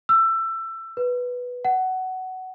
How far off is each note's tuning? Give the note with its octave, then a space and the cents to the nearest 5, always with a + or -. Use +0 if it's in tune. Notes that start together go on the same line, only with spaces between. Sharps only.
E6 +20
B4 -5
F#5 +15